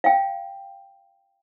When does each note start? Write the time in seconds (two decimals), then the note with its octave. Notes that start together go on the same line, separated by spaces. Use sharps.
0.04 F5 G5